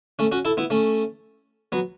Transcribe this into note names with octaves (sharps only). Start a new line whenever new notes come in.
A3 C#4
C#4 F#4
E4 A4
B3 E4
A3 C#4
F#3 B3